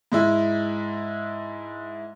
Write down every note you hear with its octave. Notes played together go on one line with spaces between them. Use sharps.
G#2 G#3 E4